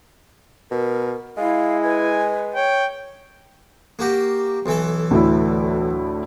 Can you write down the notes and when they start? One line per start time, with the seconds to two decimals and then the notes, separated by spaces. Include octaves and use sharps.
0.71 B2 A#4
1.37 G#3 E4 F5
1.83 B4 G#5
2.55 C#5 G5
3.99 A#3 F#4 G4
4.66 B1 E3 A4
5.11 D2 A2 E4